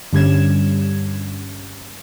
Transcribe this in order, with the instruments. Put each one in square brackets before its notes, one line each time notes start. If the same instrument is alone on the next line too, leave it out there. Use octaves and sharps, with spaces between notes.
[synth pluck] G2 D3 G3 C#4 G#6 E7